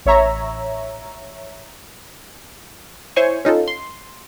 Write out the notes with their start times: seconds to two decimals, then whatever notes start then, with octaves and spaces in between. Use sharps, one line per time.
0.06 A1 C#5 E5 A#5
3.16 E4 C5 C#5 G#5 C#6
3.45 C#4 D#4 F4 A4
3.68 C6